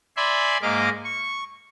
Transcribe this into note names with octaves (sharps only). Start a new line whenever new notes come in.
D5 E5 G#5 B5 C6
G#2 G#3 A#3 D#5 F5 D6
C#6